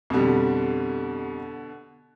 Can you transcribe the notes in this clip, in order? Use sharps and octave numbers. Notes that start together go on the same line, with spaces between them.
F2 B2 D3 G3